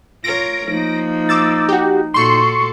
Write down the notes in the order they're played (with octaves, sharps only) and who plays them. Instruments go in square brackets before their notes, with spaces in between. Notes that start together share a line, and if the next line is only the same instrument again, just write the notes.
[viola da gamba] F4 A#4 C#5 [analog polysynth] A#6 D7
[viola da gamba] F3 A#3 [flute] D#4
[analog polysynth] D6 E6 A6
F#4 G4
[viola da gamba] A#2 F#4 A4 [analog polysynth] C6 C#6 C#7